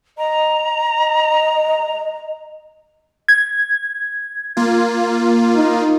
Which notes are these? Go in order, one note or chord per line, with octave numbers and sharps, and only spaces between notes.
D#5 A#5
D#5
G#6
A#3 F4
D#4